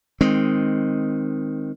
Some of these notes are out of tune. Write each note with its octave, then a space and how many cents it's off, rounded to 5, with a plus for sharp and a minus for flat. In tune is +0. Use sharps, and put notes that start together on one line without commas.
D#3 +0 G#3 +0 C4 +5